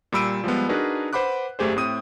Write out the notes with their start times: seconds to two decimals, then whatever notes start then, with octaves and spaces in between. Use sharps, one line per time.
0.12 A#2 G3 B5 E6 D7 D#7
0.44 F3 G3 G#3 B3
0.69 D4 D#4 F#4 G#4 A#4 B4
1.13 B4 C5 F#5 B5 D6 F#6
1.59 G#1 F#2 A3 G4 G#4 C5
1.76 A2 C4 D#6 D#7